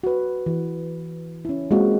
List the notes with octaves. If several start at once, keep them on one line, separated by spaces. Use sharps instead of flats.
F#4 B4
E3
C#4 E4
G#3 A#3 C4 F4 F#4